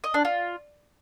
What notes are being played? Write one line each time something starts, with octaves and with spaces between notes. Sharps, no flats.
D#5
D4
F4